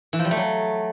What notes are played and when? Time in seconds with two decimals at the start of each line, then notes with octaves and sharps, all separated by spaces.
0.13 E3
0.19 F3
0.25 G3
0.31 A3
0.37 F#3